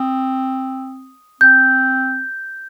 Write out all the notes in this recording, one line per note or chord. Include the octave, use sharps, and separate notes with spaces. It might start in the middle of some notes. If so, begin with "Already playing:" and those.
Already playing: C4 D#6
C4 G6